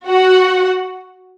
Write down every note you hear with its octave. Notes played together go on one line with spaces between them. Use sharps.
F#4 F#5